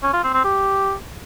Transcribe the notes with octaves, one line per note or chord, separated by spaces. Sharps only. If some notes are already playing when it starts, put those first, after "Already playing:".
C#4
F4
C4
C4
G4